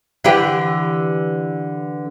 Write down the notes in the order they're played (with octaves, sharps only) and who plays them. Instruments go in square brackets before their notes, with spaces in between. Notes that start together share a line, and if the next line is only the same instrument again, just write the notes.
[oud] D3 E3 G4